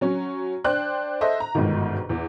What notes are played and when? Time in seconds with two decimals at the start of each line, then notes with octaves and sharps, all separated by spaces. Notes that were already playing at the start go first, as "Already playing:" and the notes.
0.01 F#3 C#4
0.64 D4 C5 G5 F#6
1.21 A4 C5 D#5 E5
1.40 A#5
1.55 G1 G#2 B2 D#3
2.09 E2